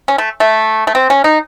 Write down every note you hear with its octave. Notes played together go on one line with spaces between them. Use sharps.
C#4
A3
A3
A3
C4
C#4
D#4